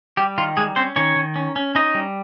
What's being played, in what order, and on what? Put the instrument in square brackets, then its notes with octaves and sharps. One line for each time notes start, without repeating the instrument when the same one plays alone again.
[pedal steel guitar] G3 G4
D#3 F4
G3 G#3 G#4
C4 C#4 C5
D#3 C#4 C#5
D#3
C#4
C#4
C#4 D#4 D#5
G3